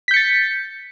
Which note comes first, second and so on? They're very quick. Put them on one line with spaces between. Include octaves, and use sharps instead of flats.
B6 G6 C#7 A6